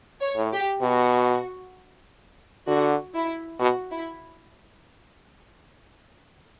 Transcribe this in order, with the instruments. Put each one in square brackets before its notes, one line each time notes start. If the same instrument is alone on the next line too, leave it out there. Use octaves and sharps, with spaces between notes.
[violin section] C#5
[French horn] A2
[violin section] G4
[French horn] B2 [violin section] F#4
[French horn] D3 [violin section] F#4
[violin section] E4
[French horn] B2 [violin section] F#4
[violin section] E4